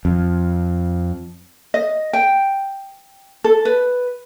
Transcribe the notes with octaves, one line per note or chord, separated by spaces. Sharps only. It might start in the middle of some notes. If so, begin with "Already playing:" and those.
F2
D#5
G5
A4
B4